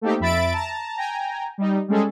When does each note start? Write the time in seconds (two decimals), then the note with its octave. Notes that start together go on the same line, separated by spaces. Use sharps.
0.01 A3 A#3 C4 D#4 G4
0.20 F2 E5 B5 A6 D7
0.53 A5 A#5
0.97 G5 G#5 A#5
1.58 G3 D#4
1.88 G3 G#3 C#4 G#4 A4